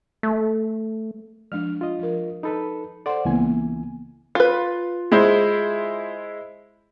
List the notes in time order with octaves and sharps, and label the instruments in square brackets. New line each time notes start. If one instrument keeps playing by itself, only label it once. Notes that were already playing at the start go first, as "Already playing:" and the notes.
[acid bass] A3
[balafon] F3 G#3 D4 [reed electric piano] F6
[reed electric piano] F4 D#5
[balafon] F3 A#4
[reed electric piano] D#4 A4 B4 [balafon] B5
[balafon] A4 F#5 C6 [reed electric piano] C5 D5
[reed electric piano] C#2 E3 G#5 [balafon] A#3 B3
[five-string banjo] F4 B4
[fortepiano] G#3 E4 C5